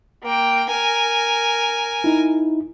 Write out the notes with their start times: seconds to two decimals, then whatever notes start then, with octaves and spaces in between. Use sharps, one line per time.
0.23 A#3 G5
0.69 A#4 G#5
2.04 D#4 E4